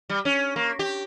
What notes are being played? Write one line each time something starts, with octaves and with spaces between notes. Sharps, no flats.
G3
C#4
A#3
G4